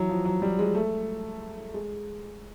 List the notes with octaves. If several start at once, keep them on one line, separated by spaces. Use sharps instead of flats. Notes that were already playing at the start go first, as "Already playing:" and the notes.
Already playing: E3 F#3
F3
F#3
G3
G#3
A3
G#3